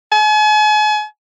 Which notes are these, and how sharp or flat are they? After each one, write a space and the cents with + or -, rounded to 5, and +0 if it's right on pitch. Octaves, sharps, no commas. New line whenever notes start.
G#5 +40